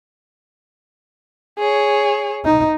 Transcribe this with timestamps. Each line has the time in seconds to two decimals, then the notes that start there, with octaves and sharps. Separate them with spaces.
1.59 G#4 C#5
2.45 D#4